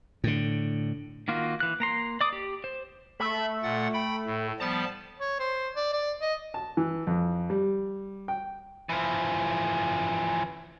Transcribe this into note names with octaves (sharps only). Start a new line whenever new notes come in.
A2 D3
D#3 A#3 F4 F#4
E3 F#6
A#3 A#5 C6
D5 D6 D#6
G4
C5
A3 E5 B5
A#2 F#5 A6
G5 B5
A2
F3 G3 B3 A5
C#5
C5
D5
D5
D#5
A5
E3
F2
G3
G5
E3 F3